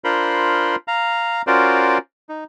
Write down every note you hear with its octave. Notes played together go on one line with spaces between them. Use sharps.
D4 F4 A#4 C5 B5 C6
F5 A#5
C#4 F4 F#4 A#4 C5 D5
D#4